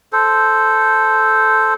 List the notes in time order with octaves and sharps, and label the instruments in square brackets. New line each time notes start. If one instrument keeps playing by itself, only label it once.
[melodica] A4 C5